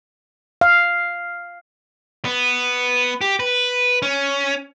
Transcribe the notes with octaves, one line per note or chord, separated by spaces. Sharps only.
F5
B3
G4
B4
C#4